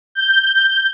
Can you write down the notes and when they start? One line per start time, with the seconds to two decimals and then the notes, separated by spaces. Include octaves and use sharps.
0.15 G6